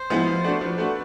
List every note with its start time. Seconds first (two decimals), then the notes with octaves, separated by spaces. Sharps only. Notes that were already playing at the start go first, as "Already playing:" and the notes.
Already playing: C5
0.10 F3 G#3 B3 E4
0.27 F3
0.44 A3 D4 F#4
0.61 F3 B4
0.78 A3 D4 F#4